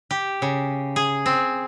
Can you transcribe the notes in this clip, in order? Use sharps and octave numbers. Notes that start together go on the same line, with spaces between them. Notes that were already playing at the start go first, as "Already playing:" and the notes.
G4
C#3
G#4
C4